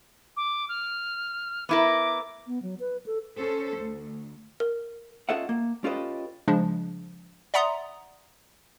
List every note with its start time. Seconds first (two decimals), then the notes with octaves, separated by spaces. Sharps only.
0.37 D6
0.69 F6
1.69 B3 E4 A#4 D6
2.47 B3
2.62 F#3
2.80 B4
3.06 A4
3.37 C#4 A4 C5
3.76 D2
4.60 A#4
5.29 C#4 F4 A4 D#5 E5 F#5
5.49 A#3
5.84 C#4 F4 G4 A4 B4 D#5
6.48 C#3 F3 G#3 D4
7.54 D5 E5 F#5 A#5 C6 D#6